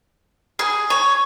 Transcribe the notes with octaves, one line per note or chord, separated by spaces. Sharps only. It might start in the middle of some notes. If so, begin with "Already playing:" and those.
G#4
C#5